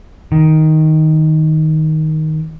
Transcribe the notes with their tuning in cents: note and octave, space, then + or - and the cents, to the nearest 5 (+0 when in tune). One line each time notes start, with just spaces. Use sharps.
D#3 +5